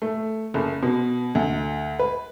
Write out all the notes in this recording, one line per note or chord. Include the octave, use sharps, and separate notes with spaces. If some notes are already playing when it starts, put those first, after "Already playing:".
A3
F#1
B2
D2
B4